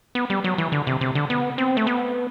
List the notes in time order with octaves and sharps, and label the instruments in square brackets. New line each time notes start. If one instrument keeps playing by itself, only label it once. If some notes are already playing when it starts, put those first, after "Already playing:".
[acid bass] B3
G3
F#3
E3
D3
C3
C3
D3
B3
C4
A3
B3